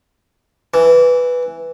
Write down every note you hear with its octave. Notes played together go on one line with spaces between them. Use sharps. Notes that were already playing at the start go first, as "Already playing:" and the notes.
E3